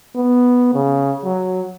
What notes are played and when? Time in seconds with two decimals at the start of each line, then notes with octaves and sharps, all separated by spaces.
0.16 B3
0.74 C#3
1.24 F#3